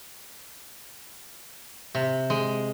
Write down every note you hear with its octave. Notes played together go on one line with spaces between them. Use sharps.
C3
G#3